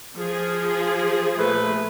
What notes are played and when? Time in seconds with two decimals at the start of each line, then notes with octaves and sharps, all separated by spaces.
0.16 F3 G#4
1.38 A#2 A3 B4